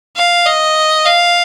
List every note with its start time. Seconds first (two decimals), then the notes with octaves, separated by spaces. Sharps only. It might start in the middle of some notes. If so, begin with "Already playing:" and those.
0.16 F5
0.46 D#5
1.05 F5